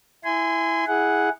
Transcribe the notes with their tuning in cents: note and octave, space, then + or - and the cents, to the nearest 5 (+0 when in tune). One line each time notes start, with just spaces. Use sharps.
E4 +0 G#5 -5 C6 -35
E4 -10 G#4 +0 F#5 +0